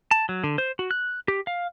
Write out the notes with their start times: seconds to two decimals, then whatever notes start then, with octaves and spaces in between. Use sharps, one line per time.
0.11 A5
0.29 F#3
0.44 D3
0.58 C5
0.79 F#4
0.91 F#6
1.28 G4
1.47 F5